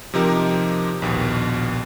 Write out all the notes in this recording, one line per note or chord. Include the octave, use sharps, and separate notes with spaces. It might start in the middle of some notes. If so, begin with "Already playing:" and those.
C3 F3 D#4 G4 A#4
A#1 D#2 B2